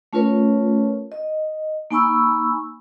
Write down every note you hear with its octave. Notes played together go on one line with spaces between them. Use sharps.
A3 C#4 F4 A#4 B4 C#5
D#5
A#3 D#4 G#5 B5 C#6 E6